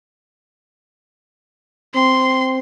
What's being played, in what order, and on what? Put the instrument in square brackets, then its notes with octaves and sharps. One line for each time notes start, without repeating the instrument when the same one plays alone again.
[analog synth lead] C4 [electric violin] C6